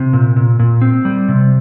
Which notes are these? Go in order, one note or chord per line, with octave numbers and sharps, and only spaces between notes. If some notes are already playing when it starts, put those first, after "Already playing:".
Already playing: C3
A#2
A#2
A#2
C4
G3
C3